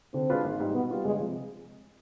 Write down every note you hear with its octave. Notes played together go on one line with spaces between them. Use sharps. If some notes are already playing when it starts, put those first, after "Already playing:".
D3 C4
G#3 D4 F4 B4
G#1
G#2 G3
B2 B3
G3 B3 F4 B4
G1 G#3
C3 F3